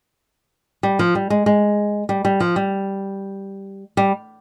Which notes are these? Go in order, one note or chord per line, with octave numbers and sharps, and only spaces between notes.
G3
F3
G3
G#3
G#3
G3
G3
F3
G3
G3